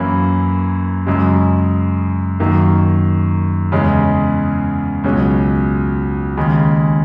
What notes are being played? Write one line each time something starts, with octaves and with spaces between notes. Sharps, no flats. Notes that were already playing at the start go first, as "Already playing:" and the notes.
Already playing: F#2 E3 A#3 C#4 E4
F#2 C#3 G#3
F#2 D#3 A#3
E2 C#3 G#3 C#4
C#2 B2 F#3 C#4
D#2 C#3 G#3